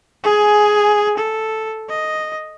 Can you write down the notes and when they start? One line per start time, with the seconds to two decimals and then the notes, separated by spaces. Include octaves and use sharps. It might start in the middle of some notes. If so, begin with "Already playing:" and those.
0.24 G#4 G#5
1.17 A4
1.90 D#5